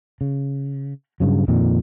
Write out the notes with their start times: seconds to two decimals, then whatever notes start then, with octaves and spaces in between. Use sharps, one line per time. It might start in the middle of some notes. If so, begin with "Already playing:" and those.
0.21 C#3
1.20 G2 C#3 F#3
1.48 F2 A#2 D#3